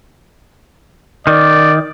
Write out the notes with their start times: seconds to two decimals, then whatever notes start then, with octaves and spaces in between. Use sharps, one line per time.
1.27 D#3 D5